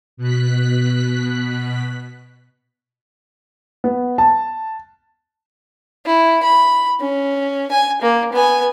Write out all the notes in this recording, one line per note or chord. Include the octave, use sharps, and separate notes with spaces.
B2 F#6 B6
B3
A5
E4
B5
C#4
G#5
A#3
B3 G#5